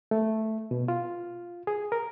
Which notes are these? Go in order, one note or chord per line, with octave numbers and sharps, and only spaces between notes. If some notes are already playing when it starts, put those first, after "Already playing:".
A3
B2
F4
G#4
A#4